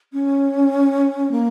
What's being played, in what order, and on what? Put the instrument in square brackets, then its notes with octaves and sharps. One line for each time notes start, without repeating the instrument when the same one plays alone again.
[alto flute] C#4
A#3